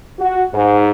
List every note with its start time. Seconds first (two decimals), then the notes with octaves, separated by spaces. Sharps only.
0.19 F#4
0.52 G#2